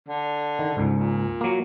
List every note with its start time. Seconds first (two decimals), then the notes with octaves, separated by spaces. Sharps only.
0.09 D3
0.59 D#3
0.76 C#2 G#2
0.93 A#2
1.41 F#3 A#3